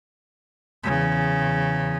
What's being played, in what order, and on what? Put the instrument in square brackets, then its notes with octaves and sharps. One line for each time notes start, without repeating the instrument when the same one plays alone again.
[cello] E2 C#3